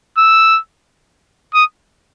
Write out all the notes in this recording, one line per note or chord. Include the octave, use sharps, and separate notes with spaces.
E6
D#6